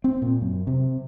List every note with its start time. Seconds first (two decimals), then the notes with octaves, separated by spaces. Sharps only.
0.04 C4
0.22 A#2
0.41 F#2
0.67 C3